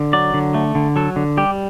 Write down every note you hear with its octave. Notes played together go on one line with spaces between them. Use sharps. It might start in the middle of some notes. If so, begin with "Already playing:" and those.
Already playing: D3
F#3 D5
D3
A3
D3
F#3 A4
D3
G3 G4